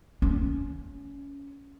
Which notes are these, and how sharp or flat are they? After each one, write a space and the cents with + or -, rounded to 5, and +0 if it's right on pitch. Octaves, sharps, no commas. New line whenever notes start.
C#4 +20